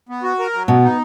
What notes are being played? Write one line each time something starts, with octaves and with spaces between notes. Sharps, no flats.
B3
F#4
A#4
F#3
B2 B3
D#4